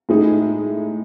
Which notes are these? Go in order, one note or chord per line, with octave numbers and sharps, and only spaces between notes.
A2 G#3 D#4 G#4